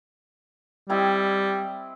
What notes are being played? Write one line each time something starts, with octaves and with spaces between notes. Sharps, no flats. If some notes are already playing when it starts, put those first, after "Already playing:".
G3 C4 E4 D#5